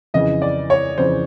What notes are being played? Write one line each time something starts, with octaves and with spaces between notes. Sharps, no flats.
F2 C#3 E3 D#5
D5
C#5
F2 C#3 E3 C5